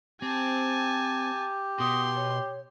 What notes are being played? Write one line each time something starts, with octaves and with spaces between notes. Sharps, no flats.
C4 G4 G#5 A5
B2 C6 D#6
C#5